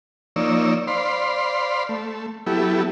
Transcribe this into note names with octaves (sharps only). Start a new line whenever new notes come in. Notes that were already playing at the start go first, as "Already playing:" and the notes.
F3 A#3 D#4 C#5 D5 E6
C5 D5 F5 B5 C6
A3
F#3 B3 E4 G4 A4